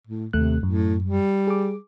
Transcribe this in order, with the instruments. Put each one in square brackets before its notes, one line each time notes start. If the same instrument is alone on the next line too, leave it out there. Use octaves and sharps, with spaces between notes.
[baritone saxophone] A2
[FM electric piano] D#2 A3 F#6 [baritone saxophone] C3
[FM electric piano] F#2 [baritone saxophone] A2
[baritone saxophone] G3
[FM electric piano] G#4 D6